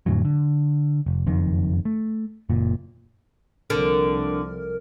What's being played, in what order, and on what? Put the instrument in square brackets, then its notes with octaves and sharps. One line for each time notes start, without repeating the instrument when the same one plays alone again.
[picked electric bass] F2 A2 D3 F#3
D3
F1
F#1 F2 D#3
A3
F#1 A#2
[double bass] C2 F3 [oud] D3 [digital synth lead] A#4